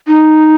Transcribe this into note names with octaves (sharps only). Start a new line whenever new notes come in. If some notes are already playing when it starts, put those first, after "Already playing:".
D#4